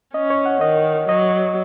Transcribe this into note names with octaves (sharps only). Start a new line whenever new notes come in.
C#4 D#5
C#5
F#5
D#3 D#5
F#3 D#5